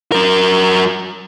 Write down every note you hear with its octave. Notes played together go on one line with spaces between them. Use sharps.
F#3 A#4